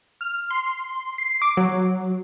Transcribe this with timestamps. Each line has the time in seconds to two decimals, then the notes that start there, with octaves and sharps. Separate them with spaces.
0.21 F6
0.51 C6
1.18 C7
1.42 D6
1.57 F#3